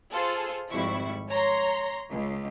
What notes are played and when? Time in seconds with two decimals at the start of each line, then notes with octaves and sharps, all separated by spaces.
0.13 F4 G#4 A4 C5
0.70 G#1 F2 G3 E4 C#6
1.33 C#5 A#5 C6
2.11 C#2